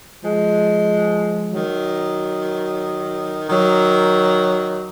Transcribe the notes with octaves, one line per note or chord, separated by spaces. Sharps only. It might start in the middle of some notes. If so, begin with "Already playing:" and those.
F3 G#3
D#3 F#3
D#3 F#3